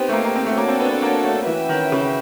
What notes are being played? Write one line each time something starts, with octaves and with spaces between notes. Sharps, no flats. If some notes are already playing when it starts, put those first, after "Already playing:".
Already playing: B3 C4 D#4 G4 C5
A3
A#3
A#3
C4
A3
A#3 D4 F#4 A4 C#5
C4
B3
B3
A#3
A3
E3 C#4 F#4 B4 E5 G5
D#3
C#3